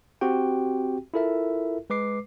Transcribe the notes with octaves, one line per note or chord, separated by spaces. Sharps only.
C4 F#4 G4 G5
E4 F4 A4 A#4 E5
G#3 B4 D6 C7